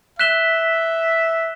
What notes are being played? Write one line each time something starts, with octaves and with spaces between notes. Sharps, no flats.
E5 F#6 B6 E7 G7